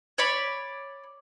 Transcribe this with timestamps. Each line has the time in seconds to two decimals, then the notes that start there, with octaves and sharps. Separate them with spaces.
0.18 C#5 D5 B5